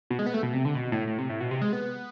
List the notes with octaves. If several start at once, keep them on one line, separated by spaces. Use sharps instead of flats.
B2
G#3
B3
A3
B2
C3
D3
B2
A2
A2
C3
A2
B2
C3
G#3
B3